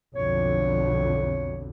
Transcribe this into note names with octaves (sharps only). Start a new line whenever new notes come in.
B1 F2 D3 C#5